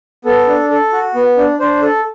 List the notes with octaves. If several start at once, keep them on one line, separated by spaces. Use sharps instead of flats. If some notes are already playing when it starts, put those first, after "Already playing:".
B3 A4
D4
A4
F#4
B3
D4
D4 C5
A4